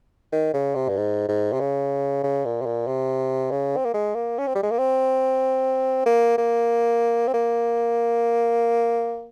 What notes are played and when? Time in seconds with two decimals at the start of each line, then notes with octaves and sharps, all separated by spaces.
0.32 D#3
0.54 C#3
0.75 C3
0.88 G2
0.97 G#2
1.28 G#2
1.53 C3
1.60 C#3
2.24 C#3
2.45 A#2
2.61 C3
2.66 A#2
2.87 C3
3.51 C#3
3.76 C4
3.85 A#3
3.94 G#3
4.15 A#3
4.38 C#4
4.47 C4
4.55 G3
4.63 G#3
4.71 A#3
4.78 C4
6.06 A#3
6.38 A#3
7.28 C4
7.34 A#3